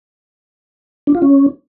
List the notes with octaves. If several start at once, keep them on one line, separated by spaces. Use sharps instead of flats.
D4
F4
C#4